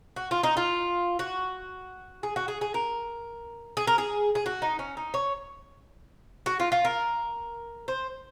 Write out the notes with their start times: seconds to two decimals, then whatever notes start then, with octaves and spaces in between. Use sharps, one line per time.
0.16 F#4
0.31 F4
0.43 D#4
0.57 F4
1.19 F#4
2.23 G#4
2.36 F#4
2.48 G#4
2.61 G#4
2.74 A#4
3.77 G#4
3.87 A#4
3.98 G#4
4.35 G#4
4.46 F#4
4.62 D#4
4.79 C#4
4.97 D#4
5.14 C#5
6.46 F#4
6.60 F4
6.72 F4
6.85 A#4
7.88 C5